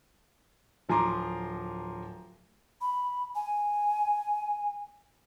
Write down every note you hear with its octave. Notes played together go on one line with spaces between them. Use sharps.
D1 F3 G#5 A#5 C6 D6
B5
G#5